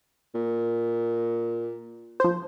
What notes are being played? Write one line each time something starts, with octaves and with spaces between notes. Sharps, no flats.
A#2
F3 C5